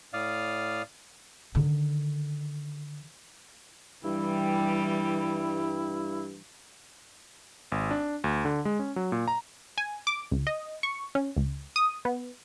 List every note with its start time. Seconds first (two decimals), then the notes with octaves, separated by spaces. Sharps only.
0.13 A2 D5 F5 D#6 F6
1.55 D3 D#3
4.04 G2 E3 G3 E4 G4
7.72 G#1
7.91 D4
8.24 D2
8.45 D3
8.65 G#3
8.79 C#4
8.96 F#3
9.12 A#2
9.28 A#5
9.78 G#5
10.07 D6
10.31 C#2
10.47 D#5
10.83 C#6
11.15 C#4
11.37 C#2
11.76 D#6
12.05 B3